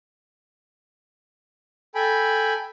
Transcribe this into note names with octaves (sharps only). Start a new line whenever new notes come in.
A4 G5 G#5 B5